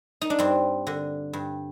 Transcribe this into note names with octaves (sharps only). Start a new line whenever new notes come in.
D#4
D4
G2 C4
D3
G2